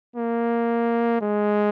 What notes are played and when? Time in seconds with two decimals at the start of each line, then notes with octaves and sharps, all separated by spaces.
0.16 A#3
1.21 G#3